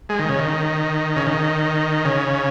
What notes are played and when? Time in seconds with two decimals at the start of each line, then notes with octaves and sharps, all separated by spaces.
0.09 G#3
0.19 D#3
0.29 C#3
0.39 D#3
1.16 C#3
1.27 D#3
2.05 C#3